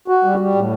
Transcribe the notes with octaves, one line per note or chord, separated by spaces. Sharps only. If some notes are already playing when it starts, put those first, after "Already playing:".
F#4
G3
G3
A2